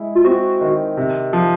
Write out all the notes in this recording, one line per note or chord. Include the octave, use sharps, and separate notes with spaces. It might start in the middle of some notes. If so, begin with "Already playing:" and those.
Already playing: G#3 E4
F4
C4 F#4
D#3
C3
F3